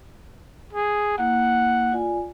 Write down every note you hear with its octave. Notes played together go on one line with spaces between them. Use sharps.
G#4
A#3 E4 F#5
F4 D5 G#5